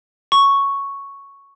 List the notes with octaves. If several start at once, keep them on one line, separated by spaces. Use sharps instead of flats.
C#6